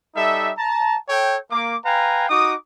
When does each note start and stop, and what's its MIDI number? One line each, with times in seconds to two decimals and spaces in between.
0.15 0.51 55
0.15 0.51 63
0.15 0.51 69
0.15 0.51 76
0.58 0.97 81
0.58 0.97 82
1.09 1.37 69
1.09 1.37 73
1.09 1.37 79
1.51 1.76 58
1.51 1.76 86
1.85 2.25 71
1.85 2.25 77
1.85 2.25 79
1.85 2.25 80
1.85 2.25 82
2.30 2.54 63
2.30 2.54 66
2.30 2.54 86
2.30 2.54 87